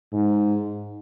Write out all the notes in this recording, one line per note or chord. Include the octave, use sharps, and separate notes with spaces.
G#2